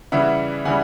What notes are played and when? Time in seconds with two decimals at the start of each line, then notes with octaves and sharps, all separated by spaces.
0.12 C#3 E3 G3 E5 F#5
0.65 C#3 E3 G3 F#5 G#5